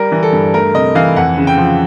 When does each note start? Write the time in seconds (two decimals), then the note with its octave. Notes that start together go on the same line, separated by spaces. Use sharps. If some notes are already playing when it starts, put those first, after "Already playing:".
Already playing: G3 A#4
0.12 E3
0.23 A4
0.33 G2
0.54 A3 A#4
0.74 C3 D#5
0.95 E3 F5
1.16 F2 F#5
1.38 C#3
1.47 G5
1.58 F3